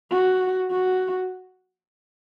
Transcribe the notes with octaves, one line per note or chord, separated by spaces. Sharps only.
F#4
F#4